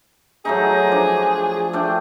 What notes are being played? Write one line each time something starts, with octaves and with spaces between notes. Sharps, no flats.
F#3 A3 D#4 G#4
F3 D4
A3 D4 G5